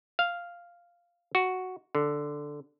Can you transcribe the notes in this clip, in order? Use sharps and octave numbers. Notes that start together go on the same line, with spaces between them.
F5
F#4
D3